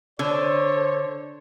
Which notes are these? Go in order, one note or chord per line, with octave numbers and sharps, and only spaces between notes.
D3 A4 C5 C#5